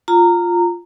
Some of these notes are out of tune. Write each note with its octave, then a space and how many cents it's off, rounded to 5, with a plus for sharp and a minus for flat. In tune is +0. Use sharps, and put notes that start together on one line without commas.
F4 +0 A#5 -20